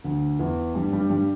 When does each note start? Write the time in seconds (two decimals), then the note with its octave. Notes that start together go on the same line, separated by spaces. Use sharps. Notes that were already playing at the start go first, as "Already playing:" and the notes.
0.04 D2 D3
0.39 E2 E3
0.75 G2 G3
0.93 G2 G3
1.10 G2 G3